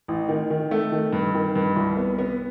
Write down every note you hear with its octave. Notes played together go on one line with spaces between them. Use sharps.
A1
D#3
D#3
A3
D#3
G2
D#3
G2
C2
B3
B3